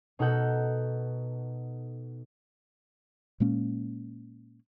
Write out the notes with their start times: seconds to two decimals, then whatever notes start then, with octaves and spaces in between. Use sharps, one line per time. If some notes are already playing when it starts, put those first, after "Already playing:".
0.19 B2 D#4 A4 F#5 G6
3.40 A#2 G#3 A#3 C#4